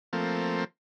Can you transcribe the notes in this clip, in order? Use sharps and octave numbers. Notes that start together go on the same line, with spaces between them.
F3 A3 A#3 C4